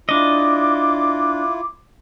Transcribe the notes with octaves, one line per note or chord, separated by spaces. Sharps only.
D4 E4 F4 D#5 D6